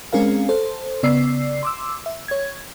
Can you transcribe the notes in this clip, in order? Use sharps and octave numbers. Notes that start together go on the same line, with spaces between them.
G#3 C4 C#4 G#4 A#4 F5
A4 C5
C#3 B3 D5 E6 C7
C6 D6 E6
E5
C#5 G#6